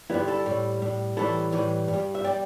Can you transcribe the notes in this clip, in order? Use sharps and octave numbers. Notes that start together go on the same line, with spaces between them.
G2 D3 G3 B3 E4
E4 A4
A2 G3
A2 G3
A2 E3 G3 E4 A4
A2 E3 G3
G2
G3
E5
G3 D5 G5